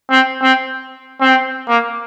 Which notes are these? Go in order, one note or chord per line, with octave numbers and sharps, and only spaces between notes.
C4
C4
C4
A#3